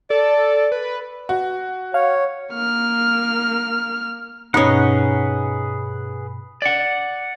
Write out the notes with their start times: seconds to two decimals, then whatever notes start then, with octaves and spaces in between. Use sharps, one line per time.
0.10 A4 D5
0.72 B4
1.29 F#4
1.94 C#5 F5
2.53 A#3 F6
4.54 G2 B2 C#4 D#4 G#4 B4 F#5
6.62 D5 F#5